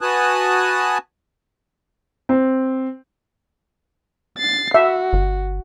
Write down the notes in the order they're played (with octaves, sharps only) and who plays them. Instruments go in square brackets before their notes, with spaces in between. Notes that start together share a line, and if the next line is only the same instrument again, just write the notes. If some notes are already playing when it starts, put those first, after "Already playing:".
[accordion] F#4 B4 G#5 A5 D#6 F#6
[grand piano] C4
[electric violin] A6 C7
[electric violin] F#4 [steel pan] E5
[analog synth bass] G1